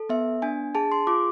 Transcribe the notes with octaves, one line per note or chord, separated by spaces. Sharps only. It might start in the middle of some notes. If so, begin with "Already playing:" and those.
Already playing: A4
B3 E5
D4 G#5
G#4 A5
C6
F4 D6